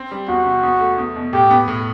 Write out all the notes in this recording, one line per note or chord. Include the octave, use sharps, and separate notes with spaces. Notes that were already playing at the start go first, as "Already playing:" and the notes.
Already playing: C4
G3
E2 F#4
C3
E2
A3
E2
B2
A2 G4
B3
A2